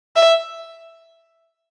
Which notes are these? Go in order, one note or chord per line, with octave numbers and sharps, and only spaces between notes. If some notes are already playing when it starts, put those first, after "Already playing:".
E5